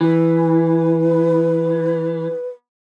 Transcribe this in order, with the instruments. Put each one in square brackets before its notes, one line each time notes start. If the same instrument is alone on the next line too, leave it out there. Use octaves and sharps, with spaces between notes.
[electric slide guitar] E3 [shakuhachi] B4